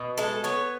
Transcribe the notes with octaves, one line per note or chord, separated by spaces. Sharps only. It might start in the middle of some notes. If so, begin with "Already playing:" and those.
Already playing: B2
G#3 A4
B3 C#5